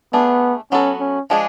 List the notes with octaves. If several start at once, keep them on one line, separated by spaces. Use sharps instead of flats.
A3 B3 D4 G#4
F#3 B3 C#4 F#4 A4
C#4
F3 G#3 D4 G#4